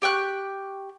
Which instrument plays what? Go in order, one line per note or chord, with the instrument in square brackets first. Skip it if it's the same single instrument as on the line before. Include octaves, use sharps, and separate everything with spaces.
[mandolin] G4 G5 C#6 F#6